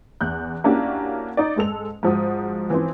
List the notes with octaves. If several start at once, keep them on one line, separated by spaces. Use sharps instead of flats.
E2 F#6 G6
A#3 C#4 D4 E4 F#4 G4
D#4 D5
G#2 G#3 A4 F7
G#2 F3 F#4 D#6
E3 F3 C4